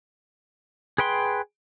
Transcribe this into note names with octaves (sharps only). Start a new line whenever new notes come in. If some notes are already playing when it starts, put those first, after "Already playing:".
G#4 B4 G5 C6